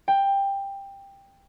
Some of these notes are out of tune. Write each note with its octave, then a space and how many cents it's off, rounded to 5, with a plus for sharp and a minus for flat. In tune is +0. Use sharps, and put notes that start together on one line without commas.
G5 +15